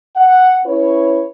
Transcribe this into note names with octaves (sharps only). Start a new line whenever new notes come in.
F#5
C#4 E4 B4 C#5